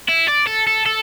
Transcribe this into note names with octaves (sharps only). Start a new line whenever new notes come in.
E4
D5
A4
A4
A4